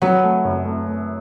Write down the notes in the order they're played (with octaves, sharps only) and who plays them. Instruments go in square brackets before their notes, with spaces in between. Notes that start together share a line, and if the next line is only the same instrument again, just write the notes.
[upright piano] F#3 [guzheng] B3
[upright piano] A3
F#2
A3
A3